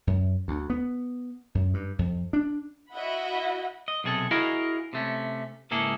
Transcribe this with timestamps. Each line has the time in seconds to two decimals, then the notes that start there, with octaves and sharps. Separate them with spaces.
0.07 F#2
0.48 D2
0.70 B3
1.55 F#2
1.74 G2
1.99 F2
2.33 D4
2.93 E4 F#4 D#5 E5 F#5 B5
3.88 D#5
4.04 B1 C3 G#4 A4
4.31 E4 F#4 G#4 A#4 D#5 F5
4.93 C3 A3 C#4
5.71 C#2 G#2 A#3 E4 G#4 A4